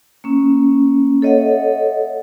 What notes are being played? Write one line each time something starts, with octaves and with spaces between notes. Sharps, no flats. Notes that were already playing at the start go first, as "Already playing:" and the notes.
A#3 C#4
A4 C#5 D#5 E5 F#5